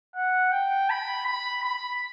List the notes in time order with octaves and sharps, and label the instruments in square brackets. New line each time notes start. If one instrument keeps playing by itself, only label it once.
[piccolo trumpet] F#5
G5
B5
B5
B5